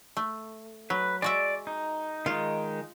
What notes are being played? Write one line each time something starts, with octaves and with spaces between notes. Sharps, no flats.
A3
F#3 B4
G#3 F#4 D5 E5
D#4
D#3 G#3 D#4 F4